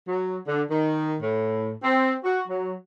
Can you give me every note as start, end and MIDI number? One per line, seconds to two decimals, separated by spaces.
0.08 0.38 54
0.47 0.62 50
0.71 1.16 51
1.21 1.71 45
1.83 2.14 60
2.24 2.41 66
2.48 2.72 54